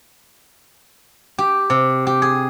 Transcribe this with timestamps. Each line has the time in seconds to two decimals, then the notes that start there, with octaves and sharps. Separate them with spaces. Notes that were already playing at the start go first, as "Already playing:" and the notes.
1.38 G4
1.70 C3
2.07 G4
2.22 G#4